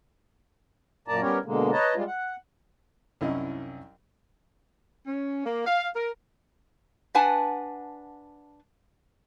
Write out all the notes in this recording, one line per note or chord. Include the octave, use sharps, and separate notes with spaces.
F#2 A#2 A#3 D5 A5 A#5
G3 B3 C#4 G4 A#4 C#5
B2 D3 G#3 A#3
B4 C#5 D#5 A5 A#5
G3 G#3 F4
F#5
C2 F#2 C#4 D#4 E4 D#5
C#4
A#3
F5
A#4
D4 B4 F#5 G#5 A5